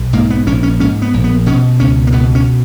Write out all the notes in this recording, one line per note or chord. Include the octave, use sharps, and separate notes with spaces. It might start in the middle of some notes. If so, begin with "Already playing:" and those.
Already playing: B1
G#2 A#3
B3
A#1 C#4
C#4
G#2 C#4
B3
A#1
B3
B2 C#4
C#2 C#4
A#3
B2 B3
C#4